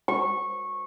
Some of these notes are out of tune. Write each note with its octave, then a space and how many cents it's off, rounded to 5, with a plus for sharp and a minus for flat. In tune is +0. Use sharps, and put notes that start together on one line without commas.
C#6 -15